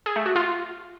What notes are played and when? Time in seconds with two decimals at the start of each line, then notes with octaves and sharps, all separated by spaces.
0.06 G#4
0.16 A3
0.26 F#4
0.36 F4